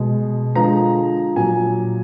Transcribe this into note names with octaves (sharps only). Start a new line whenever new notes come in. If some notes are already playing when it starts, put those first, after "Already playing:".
Already playing: B2 G#3
D3 F3 G#3 A#5
A#2 F#3 G#5